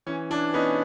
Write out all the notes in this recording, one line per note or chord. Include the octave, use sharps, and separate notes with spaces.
E3 C#4
E3 D4
B3 C#4 D#4